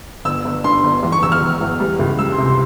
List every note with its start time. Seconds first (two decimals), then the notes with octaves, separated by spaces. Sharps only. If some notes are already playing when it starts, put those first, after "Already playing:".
0.25 G1 E6
0.45 G1
0.64 G2 C6
0.84 G1
1.03 E2
1.12 C#6
1.23 E1 E6
1.32 F6
1.42 E1
1.61 E2
1.80 G3
1.99 C#2
2.19 G3 E6
2.32 C6
2.38 C3
2.46 C6